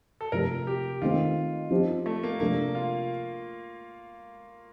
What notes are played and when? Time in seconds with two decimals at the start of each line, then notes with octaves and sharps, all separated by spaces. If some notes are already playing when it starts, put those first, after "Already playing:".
0.21 A4
0.32 C3 F3 A3 A#4
0.67 G4
1.02 D#3 A3 C4 F4
1.71 F3 C4 D#4 G4
2.06 A3
2.23 A#3
2.40 C3 F3 A3 A#3 D4
2.75 F4